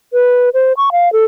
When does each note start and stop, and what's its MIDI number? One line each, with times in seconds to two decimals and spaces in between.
0.13 0.49 71
0.54 0.73 72
0.77 0.90 85
0.92 1.11 77
1.13 1.25 69